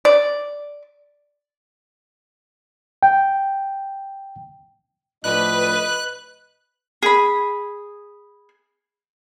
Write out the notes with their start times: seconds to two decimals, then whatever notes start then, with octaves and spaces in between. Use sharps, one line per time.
0.05 D5
3.03 G5
5.24 A2 F3 D4 B4 D#5 F#6
7.03 G#4 B5